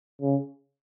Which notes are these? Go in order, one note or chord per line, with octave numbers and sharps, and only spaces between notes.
C#3